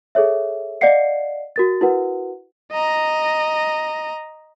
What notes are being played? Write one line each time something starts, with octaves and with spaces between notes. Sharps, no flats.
G#4 A4 C#5 E5
D5 D#5 F5 F#5 C7 C#7
F#4 A#4 A6
E4 F#4 A#4 B4 F#5
D#5 A#5